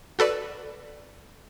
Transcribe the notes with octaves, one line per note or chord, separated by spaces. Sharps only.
F#4 A4 B4 D5